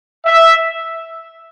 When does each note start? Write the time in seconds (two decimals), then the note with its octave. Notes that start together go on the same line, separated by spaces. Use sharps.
0.25 E5